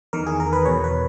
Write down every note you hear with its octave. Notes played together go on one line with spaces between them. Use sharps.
E2 D#3 A#4
G#4
A#4
B4
E2 B2 C#5
B4